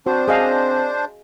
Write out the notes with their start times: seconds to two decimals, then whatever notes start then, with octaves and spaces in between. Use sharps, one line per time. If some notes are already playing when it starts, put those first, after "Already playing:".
0.06 C4 D4 F#4 C5
0.28 G#4 D#5 F5